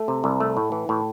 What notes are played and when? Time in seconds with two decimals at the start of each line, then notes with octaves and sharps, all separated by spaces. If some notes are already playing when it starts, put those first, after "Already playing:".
Already playing: A3
0.08 C3
0.24 C2
0.40 A3
0.57 A2
0.72 E3
0.89 A2